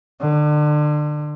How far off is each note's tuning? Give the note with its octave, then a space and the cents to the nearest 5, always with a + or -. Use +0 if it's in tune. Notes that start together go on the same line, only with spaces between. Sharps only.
D3 +30